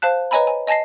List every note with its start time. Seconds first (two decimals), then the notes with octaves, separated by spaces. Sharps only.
0.02 C5 F5 A5 F#6
0.31 B4 C#5 D#5 G#5 A#5 B5
0.47 G#5
0.67 D#5 G#5 A5 A#6 C7